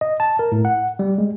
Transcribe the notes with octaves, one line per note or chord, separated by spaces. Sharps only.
D#5
A5
A#4
A2
F#5
G3
G#3